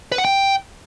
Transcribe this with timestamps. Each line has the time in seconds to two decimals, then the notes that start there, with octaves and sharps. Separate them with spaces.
0.12 B4
0.18 F#5
0.25 G5